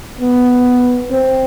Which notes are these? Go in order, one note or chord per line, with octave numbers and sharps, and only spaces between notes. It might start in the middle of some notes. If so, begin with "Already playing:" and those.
B3
C4